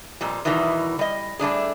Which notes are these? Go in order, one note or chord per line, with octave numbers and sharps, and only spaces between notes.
F2 A#2 G3
E2 B2 D#3 E3 G3
G3 D#5
G3 A3 D4 G#4